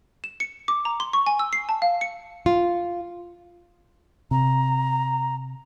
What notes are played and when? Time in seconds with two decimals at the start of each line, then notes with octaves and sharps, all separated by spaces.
0.24 E7
0.40 C#7
0.68 D6
0.85 A#5
1.00 C6
1.13 C#6
1.26 G#5
1.39 E6
1.53 C7
1.69 A5
1.82 F5
2.01 C#7
2.46 F4
4.31 C3 A#5